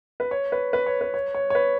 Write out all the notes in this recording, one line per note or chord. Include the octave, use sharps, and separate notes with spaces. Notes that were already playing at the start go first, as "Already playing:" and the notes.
B4
C#5
B4
B4
C#5
B4
C#5
C#5
C#5
B4